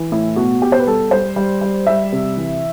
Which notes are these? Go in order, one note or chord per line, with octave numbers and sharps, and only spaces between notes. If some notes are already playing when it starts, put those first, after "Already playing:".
Already playing: E3
A2 E4
B2 F#4
B2 G4
C5
B4
G3 A4
G3 C5
G3
G3
G3 E5
C3
E3